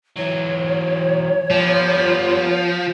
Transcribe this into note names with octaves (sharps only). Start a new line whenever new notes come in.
E3 F#3 C#5
F3 G3 B3